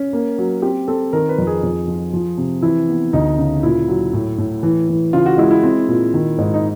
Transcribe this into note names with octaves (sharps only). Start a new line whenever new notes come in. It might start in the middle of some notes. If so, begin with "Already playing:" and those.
Already playing: C#4
A#3
F#3
C4 G4
C4 A4
D#3 A#4
B4
F2
G#4
F2
F3
F3
C3
E3 E4
B3
D2 D#4
C#3
A#2 E4
F#3
A2
A2
E3
E3
C#3 F4
F#4
G#3 E4
E4
C4
A#2
D#3
G#2
D#4